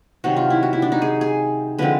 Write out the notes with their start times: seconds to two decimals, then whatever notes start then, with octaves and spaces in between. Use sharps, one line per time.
0.24 C3 D#3 F#3 F#4
0.37 F4
0.50 E4
0.63 F#4
0.73 E4
0.82 D4
0.92 D#4
1.02 G#4
1.21 G#4
1.78 D3 F3 G#3 C4 B4